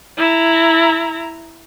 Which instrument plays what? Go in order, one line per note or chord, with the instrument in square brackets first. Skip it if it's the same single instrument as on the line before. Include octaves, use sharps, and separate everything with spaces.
[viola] E4 A#5